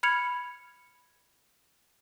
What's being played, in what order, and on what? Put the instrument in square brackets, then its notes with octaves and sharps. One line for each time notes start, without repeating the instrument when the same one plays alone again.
[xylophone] B5 F6 G#6 C#7 F7